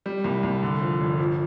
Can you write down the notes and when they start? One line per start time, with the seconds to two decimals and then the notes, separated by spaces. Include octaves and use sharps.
0.06 G3
0.24 C2
0.43 C2
0.63 D3
0.82 F3
1.00 G1
1.19 F3